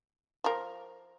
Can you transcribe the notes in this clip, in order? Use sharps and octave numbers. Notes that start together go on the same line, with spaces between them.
F3 A#4